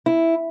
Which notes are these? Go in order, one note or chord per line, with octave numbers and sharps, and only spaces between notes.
E4